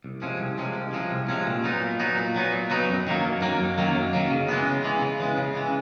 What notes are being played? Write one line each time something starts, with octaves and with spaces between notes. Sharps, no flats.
C2
C3 F3 G#3 C#4
C2
C3 F3 G#3 C#4
C2
C3 F3 G#3 C#4
C2
C3 F3 G#3 C#4
A#2
F#3 B3 D#4
A#2
F#3 B3 D#4
A#2
F#3 B3 D#4
A#2
F#3 B3 D#4
F#2
D#3 F#3 A#3
F#2
D#3 F#3 A#3
F#2
D#3 F#3 A#3
F#2
D#3 F#3 A#3
C#3
E3 G#3 B3
C#3
E3 G#3 B3
C#3
E3 G#3 B3
C#3
E3 G#3 B3